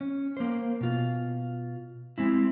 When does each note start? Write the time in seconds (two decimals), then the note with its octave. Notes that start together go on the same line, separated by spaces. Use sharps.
0.01 C#4
0.37 A#3 C5
0.81 B2 F4
2.18 G#3 C4 E4